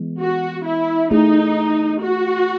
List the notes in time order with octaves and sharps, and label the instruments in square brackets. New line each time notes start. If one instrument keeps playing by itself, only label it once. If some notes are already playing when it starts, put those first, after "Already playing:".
Already playing: [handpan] E3 G#3 B3
[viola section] F#4
E4
[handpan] A3 E4 G#4 [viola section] D#4
[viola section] F#4